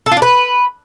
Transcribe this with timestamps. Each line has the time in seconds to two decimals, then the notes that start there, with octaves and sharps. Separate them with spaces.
0.06 A4
0.11 F4
0.17 D4
0.22 B4